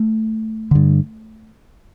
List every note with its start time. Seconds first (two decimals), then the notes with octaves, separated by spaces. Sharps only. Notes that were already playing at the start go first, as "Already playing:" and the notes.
Already playing: A3
0.71 G2 D3